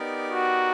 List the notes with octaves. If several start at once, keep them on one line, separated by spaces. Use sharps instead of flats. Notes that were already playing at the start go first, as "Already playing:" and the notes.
Already playing: B3 D#4 G4 A#4 D5
F#4